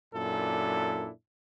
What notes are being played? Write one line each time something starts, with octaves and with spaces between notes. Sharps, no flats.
F#2 A#2 D4 E4 A4